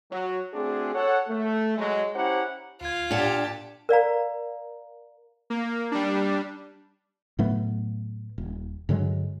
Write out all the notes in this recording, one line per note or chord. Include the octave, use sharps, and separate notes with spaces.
F#3
A3 C4 D4 F#4 G#4
A4 C#5 F#5
A3
F#3 G#3
C#4 E4 G4 C5 F#5 A#5
D2 F4 G#6
A#2 D4 G4 D5 F#5 A5 G#6
A#4 D5 F5 A#5
A#3
G3 D4
A2 F#3 A3 B3
D#1
G2 D3 F#3 G#3